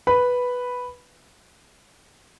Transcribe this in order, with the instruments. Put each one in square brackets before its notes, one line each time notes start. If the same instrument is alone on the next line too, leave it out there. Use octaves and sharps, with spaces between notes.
[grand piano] B4 B5